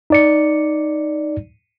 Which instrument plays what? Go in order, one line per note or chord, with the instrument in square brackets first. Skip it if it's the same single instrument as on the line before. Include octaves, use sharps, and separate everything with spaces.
[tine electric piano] D#4 D5 C#7